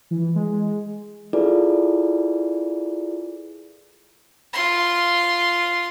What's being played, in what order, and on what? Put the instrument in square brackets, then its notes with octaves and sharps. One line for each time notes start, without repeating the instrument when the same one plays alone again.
[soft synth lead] E3
G#3
[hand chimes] E4 F4 G#4 A4 B4 D5
[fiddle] F4 C6